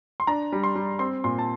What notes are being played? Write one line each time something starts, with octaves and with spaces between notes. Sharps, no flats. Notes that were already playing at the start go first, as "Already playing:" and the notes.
C6
D4 A#5
G3
C6
G3
C4 C6
A#2 C6
A5